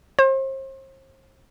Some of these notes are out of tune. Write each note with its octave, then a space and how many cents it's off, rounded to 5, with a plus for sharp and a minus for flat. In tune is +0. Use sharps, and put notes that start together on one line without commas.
C5 +40